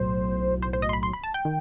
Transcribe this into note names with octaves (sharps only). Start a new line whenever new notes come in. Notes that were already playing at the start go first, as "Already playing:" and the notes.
Already playing: B1 A2 F#3 C5
C5
C5
D#5
C6
B5
C6
B5
A5
G5
D#3